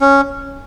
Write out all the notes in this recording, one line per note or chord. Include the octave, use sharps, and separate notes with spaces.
C#4